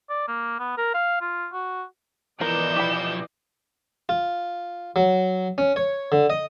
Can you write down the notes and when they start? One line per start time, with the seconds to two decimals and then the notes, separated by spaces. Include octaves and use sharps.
0.10 D5
0.28 A#3
0.59 B3
0.78 A#4
0.94 F5
1.21 F4
1.53 F#4
2.41 E3 F3 B3 A#4 D5 D#5 G6 E7
2.76 B1 F3 G4 B5
4.09 F4
4.96 F#3
5.58 C#4
5.76 C#5
6.12 D3
6.30 D#5